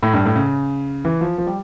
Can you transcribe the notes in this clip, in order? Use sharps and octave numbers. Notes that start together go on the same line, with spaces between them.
A2
G2
A2
C#3
E3
F3
F3
G3